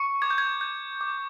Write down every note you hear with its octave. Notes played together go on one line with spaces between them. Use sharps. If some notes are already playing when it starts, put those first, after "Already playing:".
Already playing: C#6 C#7
D6 G#6
G6
G#6
G6
D6